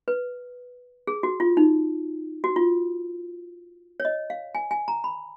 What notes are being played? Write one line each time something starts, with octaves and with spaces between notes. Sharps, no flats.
B4
G#4
F#4
F4
D#4
F#4
F4
C#5
D#5
F5
G#5
G#5
A#5
B5